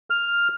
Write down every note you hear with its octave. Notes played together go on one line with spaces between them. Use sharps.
F6